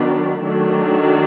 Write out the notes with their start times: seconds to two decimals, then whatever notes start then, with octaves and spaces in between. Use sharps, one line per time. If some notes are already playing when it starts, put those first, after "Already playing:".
Already playing: D#3 F#3 B3 D4
0.45 D#3 F#3 A3 D4